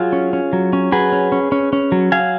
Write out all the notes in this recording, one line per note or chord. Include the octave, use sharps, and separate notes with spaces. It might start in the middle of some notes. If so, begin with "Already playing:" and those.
Already playing: F#3 F4 G#4
C#4
C#4
F#3
C#4
F#3 G#4 B4
C#4
C#4
C#4
C#4
F#3
F#3 F5 G#5